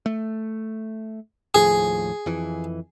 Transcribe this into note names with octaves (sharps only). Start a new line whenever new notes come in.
A3
D#2 A2 F3 G#4
F2 E3